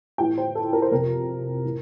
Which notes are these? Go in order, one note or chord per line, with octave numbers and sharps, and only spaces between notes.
A2 E3 G5
C5
A4
A#4
C5
F2 C3 F3 A#4
A2 E3